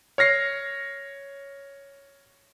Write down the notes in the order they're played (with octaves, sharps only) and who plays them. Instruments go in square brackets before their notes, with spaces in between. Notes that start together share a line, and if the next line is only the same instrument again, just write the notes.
[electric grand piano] C#5 F6 A#6 C7